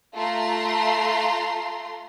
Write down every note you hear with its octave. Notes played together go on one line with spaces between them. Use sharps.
A3 F4 A#5 C6